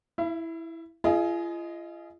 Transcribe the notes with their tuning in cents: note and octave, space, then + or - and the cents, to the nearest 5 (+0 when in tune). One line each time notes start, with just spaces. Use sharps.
E4 +0 E5 +45
F4 -45 G#4 +20 D#5 +0